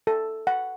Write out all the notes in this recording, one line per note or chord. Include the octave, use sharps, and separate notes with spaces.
A4
F#5